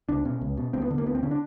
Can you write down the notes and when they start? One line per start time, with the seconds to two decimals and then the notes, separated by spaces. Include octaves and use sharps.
0.09 C#2 D4
0.25 B2 C#4
0.41 C#2
0.57 B2
0.73 D2 C4
0.82 B3
0.90 D3
0.98 A#3
1.06 D2 B3
1.15 C4
1.23 D3 C#4
1.31 D4